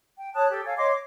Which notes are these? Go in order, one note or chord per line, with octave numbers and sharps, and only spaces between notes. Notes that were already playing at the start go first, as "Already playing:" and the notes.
G5
C#5 A5 D#6 F#6
G4 A4
A4 C#5 F5 G#5
C#5 D#5 C6 D6
D6